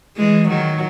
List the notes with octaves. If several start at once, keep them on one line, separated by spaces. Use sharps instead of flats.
E3 G#3
D#3 F#3